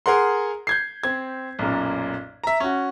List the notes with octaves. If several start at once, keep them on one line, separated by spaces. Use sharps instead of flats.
G#4 A#4 F#5 C6
G6 G#6 C7
C4 G#6
B1 F#2 A#2
E5 A#5
C#4 F#4